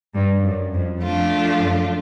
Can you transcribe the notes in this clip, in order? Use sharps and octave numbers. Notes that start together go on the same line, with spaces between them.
G2
F#2
F2
F3 A3 D4 F4
F#2